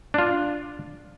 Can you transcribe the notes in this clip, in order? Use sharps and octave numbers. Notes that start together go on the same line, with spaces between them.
D4 F4